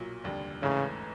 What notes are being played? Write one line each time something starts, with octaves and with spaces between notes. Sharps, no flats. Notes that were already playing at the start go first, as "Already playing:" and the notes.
Already playing: B1 A#2 F#3
F1 D#2 D3 G3
A1 G#2 C#3 E3 A3 C#4